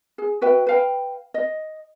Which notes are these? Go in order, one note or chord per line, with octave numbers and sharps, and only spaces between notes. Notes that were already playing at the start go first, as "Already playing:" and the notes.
G#4
F#4 B4 E5 G5
B4 F5 G5
D#5